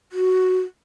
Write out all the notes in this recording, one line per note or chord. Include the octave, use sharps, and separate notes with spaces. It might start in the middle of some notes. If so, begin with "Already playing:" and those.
F#4